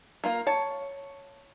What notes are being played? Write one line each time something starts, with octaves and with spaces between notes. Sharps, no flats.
A#3 F4 A#4
C#5 A5